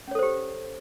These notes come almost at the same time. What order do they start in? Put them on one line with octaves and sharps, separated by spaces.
C#4 C#5 A4 C5 G4